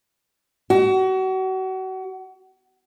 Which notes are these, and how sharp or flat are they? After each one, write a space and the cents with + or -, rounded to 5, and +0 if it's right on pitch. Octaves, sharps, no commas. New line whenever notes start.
F#4 +35